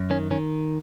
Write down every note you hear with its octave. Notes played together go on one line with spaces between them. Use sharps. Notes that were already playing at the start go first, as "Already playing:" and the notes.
Already playing: F#2
D#3 C#4
D#3 C#4